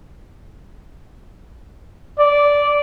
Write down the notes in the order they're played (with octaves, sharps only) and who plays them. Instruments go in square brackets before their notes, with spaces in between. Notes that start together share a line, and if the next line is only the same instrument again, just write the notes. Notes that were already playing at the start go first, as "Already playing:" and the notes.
[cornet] D5